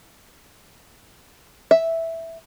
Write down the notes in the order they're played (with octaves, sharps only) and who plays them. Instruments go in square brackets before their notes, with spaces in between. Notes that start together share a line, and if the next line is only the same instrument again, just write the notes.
[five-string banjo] E5